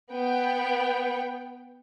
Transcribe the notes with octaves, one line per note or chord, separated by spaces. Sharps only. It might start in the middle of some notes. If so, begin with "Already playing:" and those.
B3 G5